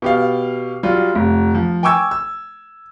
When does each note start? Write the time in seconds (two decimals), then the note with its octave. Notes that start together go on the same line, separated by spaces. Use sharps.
0.02 B2 G4 F5
0.83 F#3 G3 F4
1.15 F1
1.55 F3
1.83 G5 G#5 C#6 D6 E6 G#6
2.11 E6